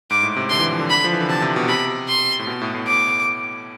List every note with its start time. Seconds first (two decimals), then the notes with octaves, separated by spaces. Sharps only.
0.10 G#2 D6
0.23 A2
0.36 C3
0.50 D3 C6
0.59 E3
0.70 F3
0.79 D3
0.90 B5
1.04 F3
1.13 E3
1.21 D3
1.29 C3 A5
1.42 C3
1.56 B2
1.68 C3 B5
2.08 C6
2.39 A2
2.47 B2
2.61 A2
2.74 A2
2.87 D6